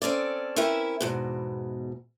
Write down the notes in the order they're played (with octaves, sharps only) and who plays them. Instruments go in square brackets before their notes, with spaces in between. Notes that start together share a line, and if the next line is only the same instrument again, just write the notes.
[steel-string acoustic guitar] C4 C#4 A4 D5
C4 C#4 E4 A#4 B4 E5
E2 G#2 B2